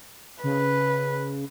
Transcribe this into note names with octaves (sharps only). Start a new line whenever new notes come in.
C#3 B4